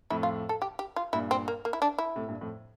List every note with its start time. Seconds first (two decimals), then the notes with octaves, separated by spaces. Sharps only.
0.10 F2 A2 E4
0.23 F4
0.49 A4
0.62 G4
0.79 G4
0.96 F4
1.13 G2 A#2 E4
1.31 C4
1.48 A#3
1.65 A#3
1.73 E4
1.82 D4
1.98 E4
2.16 A2 C3
2.28 G2 A#2
2.41 F2 A2